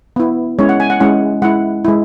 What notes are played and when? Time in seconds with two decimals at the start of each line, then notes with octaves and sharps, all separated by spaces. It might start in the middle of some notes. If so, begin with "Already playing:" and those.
0.16 B3 E4
0.59 G#3 C#4 E4 C#5
0.69 F#5
0.80 G#5
0.90 F#5
1.00 G#3 C#4 E4 F#5
1.42 G#3 E4 F#5
1.85 G#3 E4